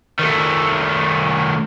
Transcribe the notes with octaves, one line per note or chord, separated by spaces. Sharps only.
D#3 A3